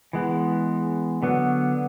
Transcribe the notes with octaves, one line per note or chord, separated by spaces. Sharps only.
E3 G#3 B3
D3 F#3 B3